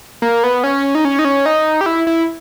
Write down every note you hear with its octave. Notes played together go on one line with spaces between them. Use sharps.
A#3
B3
C#4
D#4
C#4
D#4
C#4
D#4
G4
E4
E4